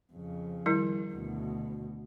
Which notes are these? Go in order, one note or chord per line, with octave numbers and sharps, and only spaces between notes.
F2 C#3
D#3 G3 E4
D2 B2